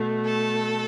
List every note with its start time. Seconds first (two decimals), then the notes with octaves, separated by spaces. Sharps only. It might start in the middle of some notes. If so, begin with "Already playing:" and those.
Already playing: B2 A3
0.24 A4